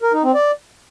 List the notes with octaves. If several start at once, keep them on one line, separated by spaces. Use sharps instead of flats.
A#4
D#4
C4
D5